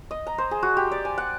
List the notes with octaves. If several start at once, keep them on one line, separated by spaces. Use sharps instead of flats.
D#5
A#5
C5
G#4
F#4
G4
D5
G#5
F#5